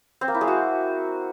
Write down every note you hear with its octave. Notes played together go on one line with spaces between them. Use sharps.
C4
A#3
E4
G#3
F#4